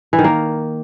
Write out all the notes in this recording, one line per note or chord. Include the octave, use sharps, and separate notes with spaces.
E3
D#3
A#3